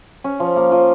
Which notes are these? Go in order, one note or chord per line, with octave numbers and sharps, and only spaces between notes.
C#4
F3
A#3
F3